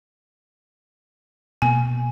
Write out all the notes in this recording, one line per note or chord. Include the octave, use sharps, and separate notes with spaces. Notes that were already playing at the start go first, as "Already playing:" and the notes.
B2 A#3 G#5